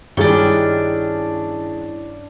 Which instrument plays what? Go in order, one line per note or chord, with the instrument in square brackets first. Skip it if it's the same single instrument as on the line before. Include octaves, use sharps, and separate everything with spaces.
[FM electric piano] G2 [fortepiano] D#3 G3 G#3 [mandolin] C#4 D4 [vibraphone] E4